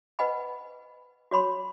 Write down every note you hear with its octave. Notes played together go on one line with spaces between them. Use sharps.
B4 C5 D#5 F#5 G#5 B5
F#4 C#5 B5 C6